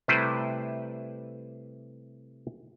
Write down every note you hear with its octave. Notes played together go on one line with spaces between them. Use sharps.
C3 G3 A3 E4 B4 C5